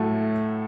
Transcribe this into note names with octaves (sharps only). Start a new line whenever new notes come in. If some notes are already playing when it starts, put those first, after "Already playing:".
Already playing: A2 F#3 A3